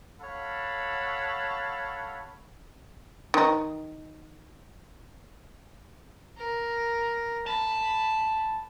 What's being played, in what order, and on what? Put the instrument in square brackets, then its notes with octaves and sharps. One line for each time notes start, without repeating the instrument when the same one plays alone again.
[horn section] A4 C#5 F5 F#5 A5 B5
[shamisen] D#3 D#4
[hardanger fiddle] A#4
[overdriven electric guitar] A5 [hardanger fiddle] B5